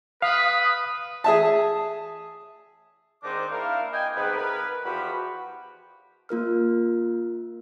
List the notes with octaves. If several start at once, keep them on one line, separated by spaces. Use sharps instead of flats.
B4 F5 D#6
G#4 E5 A5
G#2 D#3 C4 D4 D#4 D6
A#3 D4 E4 A#4 F5
D#5 G5 G#5
G#2 C3 G3 B3 B4
A#4 B4
E2 F3 F#4 G4 B5
A#3 F4 A#4 F6